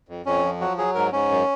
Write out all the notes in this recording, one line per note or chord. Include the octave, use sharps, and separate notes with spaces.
F2
F2 C#4
F3
F#3 F#4
F#3 G#4
G#2 A#4
G#2 C#4
F#2